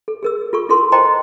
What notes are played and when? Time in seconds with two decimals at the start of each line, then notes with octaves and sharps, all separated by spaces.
0.08 A4
0.23 G#4 A#4 E6
0.53 F4 A4 C#6
0.69 E4 F4 A4 A#4 C6
0.92 C5 D#5 G5 A5 A#5 C6
1.05 C5